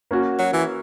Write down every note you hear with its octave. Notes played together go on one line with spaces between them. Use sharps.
A#3 C#4 F#4
F#3
E3